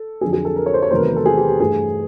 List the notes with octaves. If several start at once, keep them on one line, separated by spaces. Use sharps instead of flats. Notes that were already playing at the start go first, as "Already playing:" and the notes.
Already playing: A4
F2 D3 F#3 G#4
G#4
A4
A#4
C#5
C5
C#5
E2 C3 D#3 F#3 A3 A#4 C5
B4
A#4
A4
G#4
G4
G4
G2 E3 A3 G#4